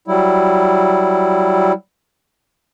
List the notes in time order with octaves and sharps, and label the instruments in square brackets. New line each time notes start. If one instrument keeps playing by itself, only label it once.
[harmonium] F#3 G3 E4